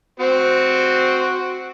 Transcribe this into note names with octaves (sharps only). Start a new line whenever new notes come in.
C4 F#4 C5